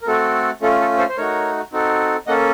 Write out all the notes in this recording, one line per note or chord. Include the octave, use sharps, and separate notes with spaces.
A#4
A3 C4 F#4 A4
A3 C#4 F4 A4
A4
A4 C5
C5
A3 D#4 F#4 A#4 C#5
C4 D#4 F#4 A4
A#3 C#4 A4 D#5 F#5